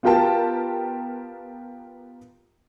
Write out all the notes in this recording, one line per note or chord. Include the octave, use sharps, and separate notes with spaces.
B3 F4 G4 A#4 G5 A5